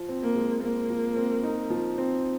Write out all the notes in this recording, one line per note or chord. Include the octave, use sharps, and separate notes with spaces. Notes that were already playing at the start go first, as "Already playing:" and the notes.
Already playing: F3
C4
A#3
G#3
A#3 C4
F3
C4
D#4
F3
C4